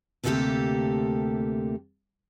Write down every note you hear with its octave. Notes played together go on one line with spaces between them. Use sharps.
D2 C3 A3 A#3 G4 A4